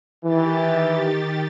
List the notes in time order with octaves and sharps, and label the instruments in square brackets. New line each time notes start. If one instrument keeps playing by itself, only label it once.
[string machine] D#3 G4 A6 [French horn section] E3